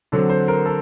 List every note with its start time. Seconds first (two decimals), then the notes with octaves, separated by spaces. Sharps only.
0.12 D3 F#3 C4 A4
0.29 C5
0.48 A#4
0.65 A4